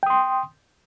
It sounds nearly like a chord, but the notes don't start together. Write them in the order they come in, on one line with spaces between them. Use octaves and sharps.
G5 D#6 C6